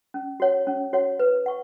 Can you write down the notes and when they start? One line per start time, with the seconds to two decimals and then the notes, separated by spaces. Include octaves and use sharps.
0.14 C#4
0.40 F#4 C#5 F#5
0.67 C#4
0.93 F#4 C#5 F#5
1.19 B4
1.46 F#5 C#6